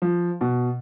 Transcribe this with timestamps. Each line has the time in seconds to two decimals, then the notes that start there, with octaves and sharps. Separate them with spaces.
0.02 F3
0.41 B2